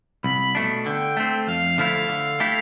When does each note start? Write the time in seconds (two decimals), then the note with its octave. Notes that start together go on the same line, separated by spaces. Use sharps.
0.24 C2 B5
0.55 B2 A3 D4
0.86 D3 G5
1.17 A3 C4
1.47 F2 F5
1.78 D3 F3 A3 E4 F5
2.09 D3
2.40 A3 E4 G4